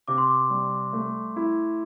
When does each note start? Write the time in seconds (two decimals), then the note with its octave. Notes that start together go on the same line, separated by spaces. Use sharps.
0.08 C3 D6
0.18 C6
0.28 D6
0.50 G3
0.93 A3
1.36 E4